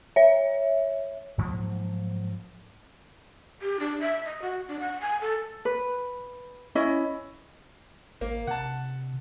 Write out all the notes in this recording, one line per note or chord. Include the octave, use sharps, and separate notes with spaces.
C#5 E5
G#2 F3 F#3 A#3
G4
D4
E5
D#5
F#4
D4
F#5
G#5
A4
B4
C#4 E4 D#5
A1 A#3
C3 F#5 A5